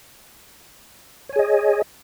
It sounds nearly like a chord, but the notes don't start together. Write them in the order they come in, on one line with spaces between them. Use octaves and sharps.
C#5 G#5 G#4 D#5